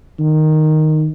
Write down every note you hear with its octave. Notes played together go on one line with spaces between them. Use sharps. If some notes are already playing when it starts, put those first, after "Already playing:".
D#3